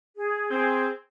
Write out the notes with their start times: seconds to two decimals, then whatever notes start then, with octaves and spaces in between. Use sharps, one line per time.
0.16 G#4
0.51 C4 G#4 C5